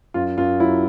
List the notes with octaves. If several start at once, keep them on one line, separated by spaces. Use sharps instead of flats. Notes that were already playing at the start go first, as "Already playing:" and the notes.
F#2 F4
F#2 F4
F#3 E4